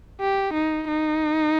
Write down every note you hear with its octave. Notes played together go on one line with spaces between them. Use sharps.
G4
D#4
D#4